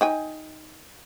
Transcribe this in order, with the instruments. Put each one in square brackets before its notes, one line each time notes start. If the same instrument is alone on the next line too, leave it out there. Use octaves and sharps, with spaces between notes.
[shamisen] D#4 G5 G#5